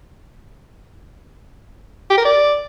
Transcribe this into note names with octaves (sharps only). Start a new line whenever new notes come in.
G4
A#4
D5